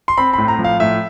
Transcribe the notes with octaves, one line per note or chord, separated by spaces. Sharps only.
C6
C4 B5
A2 B5
A#5
F3
F5
A2 E5